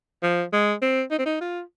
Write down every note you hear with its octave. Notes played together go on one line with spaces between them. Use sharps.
F3
G#3
C4
D#4
C4
D#4
F4